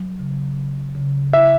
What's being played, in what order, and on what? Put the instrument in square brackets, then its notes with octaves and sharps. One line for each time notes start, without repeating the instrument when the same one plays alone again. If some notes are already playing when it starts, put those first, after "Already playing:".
Already playing: [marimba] F#3
C#3
C#3
C#3
[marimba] E4 [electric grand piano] E5